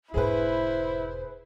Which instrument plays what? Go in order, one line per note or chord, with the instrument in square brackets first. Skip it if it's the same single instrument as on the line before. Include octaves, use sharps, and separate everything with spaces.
[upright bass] E1 G#2 [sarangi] E4 [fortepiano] G#4 B4 [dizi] C5